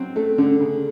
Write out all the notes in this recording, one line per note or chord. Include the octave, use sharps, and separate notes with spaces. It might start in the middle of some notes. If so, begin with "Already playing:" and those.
Already playing: F#3 C4
A3
D3
C#3